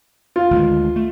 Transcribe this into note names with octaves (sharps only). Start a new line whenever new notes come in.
F4
D2 D#3 G#3
A3